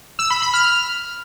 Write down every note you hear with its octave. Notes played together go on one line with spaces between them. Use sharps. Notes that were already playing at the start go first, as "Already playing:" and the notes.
E6
B5
B5
F6